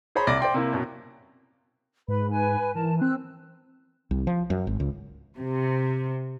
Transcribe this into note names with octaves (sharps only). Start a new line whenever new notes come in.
G#4 C5 C#5 A#5 B5
C2 D5 A#6
C5 D5 G5 C6
C3 A#3 E4
F#2 B2
G#2 B4 B5
B4 G#5
E3 A#4 A5
C4 E6 F#6
C2
F3
F#2
G#1
C#2
C3